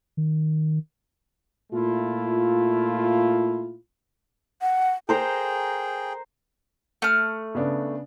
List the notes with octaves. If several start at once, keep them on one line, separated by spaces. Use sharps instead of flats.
D#3
A#2 A3 E4 F4
F#5
G#4 A#4 C5 G5 A#5
A3 F6
C#3 B3 D4